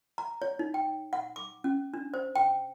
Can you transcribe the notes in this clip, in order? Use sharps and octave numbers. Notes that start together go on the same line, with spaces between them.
A#5
C#5
D#4
G5
F#5
D6
C#4
D4
C5
G5